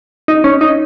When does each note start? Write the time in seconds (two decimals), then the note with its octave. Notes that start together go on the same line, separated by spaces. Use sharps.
0.28 D#4
0.44 C#4
0.61 D#4